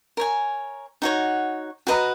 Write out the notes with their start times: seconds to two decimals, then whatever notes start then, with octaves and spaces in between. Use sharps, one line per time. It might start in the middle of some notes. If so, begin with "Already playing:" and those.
0.17 A#4 C#5 G#5
1.02 D#4 F#4 C#5 F#5
1.87 F#4 B4 D#5 A#5